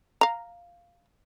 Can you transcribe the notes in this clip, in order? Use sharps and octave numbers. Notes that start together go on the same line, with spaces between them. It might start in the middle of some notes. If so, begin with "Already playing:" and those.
F5 A#5